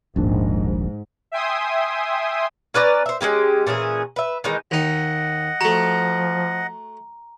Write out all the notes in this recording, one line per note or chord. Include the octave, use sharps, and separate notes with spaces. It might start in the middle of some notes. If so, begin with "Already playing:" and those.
D#1 A#1 G#2 D4
E5 G5 G#5 C6 D#6
C#4 B4 D5 A#5
C5 E5
G#3 A#3 C#4 G4
A#2 E3 C#4 G#4
B4 E5
D#3 E3 G#3 D#4
D#2 D#4 D#5 F#5
F3 A3 F#4 A#5